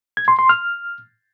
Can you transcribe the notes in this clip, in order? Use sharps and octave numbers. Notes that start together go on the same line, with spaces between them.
G#6
C6
C6
F6